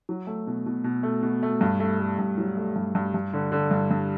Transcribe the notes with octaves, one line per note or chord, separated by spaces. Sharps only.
F#3
A3
B2
B2
B2
A3
B2
A3
G2
A3
A3
G2
F#3
A3
G2
G2
G2
D3
D3
G2
G2